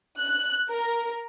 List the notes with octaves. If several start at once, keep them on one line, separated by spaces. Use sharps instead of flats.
F#6
A#4